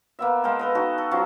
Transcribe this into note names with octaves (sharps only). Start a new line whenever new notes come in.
A#3 B3 E5
G#3 F5 G5 A5
A4 B4 D#5
D#4 F#4 A5
A4
F3 F#3 C#4